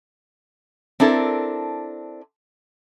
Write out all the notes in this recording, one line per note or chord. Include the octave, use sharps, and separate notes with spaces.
C4 D4 E4 A4 A#4